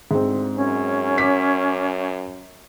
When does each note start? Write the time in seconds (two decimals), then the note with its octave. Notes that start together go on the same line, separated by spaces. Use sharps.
0.11 D2 G#2 C4
0.55 F#2 C#4
1.18 D6 B6